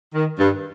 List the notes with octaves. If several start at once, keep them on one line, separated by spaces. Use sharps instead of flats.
D#3
G2